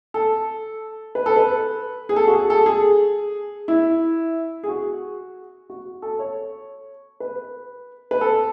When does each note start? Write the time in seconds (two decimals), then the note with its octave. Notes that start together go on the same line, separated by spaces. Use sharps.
0.14 A4
1.15 B4
1.26 A4
1.36 B4
2.09 G#4
2.16 A4
2.28 F#4
2.34 G#4
2.50 A4
2.66 G#4
3.68 E4
4.63 G#4
4.68 F#4
5.70 F#4
6.02 A4
6.19 C#5
7.20 B4
8.11 B4
8.21 A4